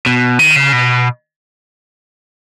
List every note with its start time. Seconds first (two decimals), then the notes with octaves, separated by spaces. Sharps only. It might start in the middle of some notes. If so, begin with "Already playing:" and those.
0.06 B2
0.39 D#3
0.56 C#3
0.72 B2